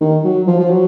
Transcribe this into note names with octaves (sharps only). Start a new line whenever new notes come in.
D#3
F#3
F3
F3
F#3